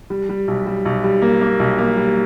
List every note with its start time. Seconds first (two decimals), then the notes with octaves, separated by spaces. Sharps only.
0.10 G3
0.29 G3
0.48 B1
0.67 G3
0.85 B1
1.04 G3
1.22 A#3
1.41 A#3
1.59 B1
1.78 A#3
1.97 G3